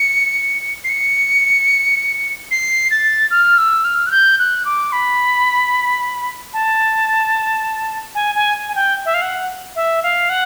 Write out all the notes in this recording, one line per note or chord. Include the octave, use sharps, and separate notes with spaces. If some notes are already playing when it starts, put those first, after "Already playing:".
Already playing: C#7
C7
C#7
C7
A6
F6
E6
F6
F#6
G6
F#6
D6
B5
A5
G#5
G#5
G#5
G5
E5
F5
F#5
E5
F5
F#5